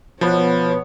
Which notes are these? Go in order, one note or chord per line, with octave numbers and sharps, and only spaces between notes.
B2 F3 B3 C#5